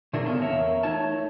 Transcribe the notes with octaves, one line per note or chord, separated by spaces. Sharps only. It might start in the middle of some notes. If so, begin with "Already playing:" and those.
C3 A3 D4 E4 G#4 A#4
A#3 B3 C#4 A4 A#4
E2 A#3 A#4 C#5 E5 A#5
A3 D#4 E4 C#5 A5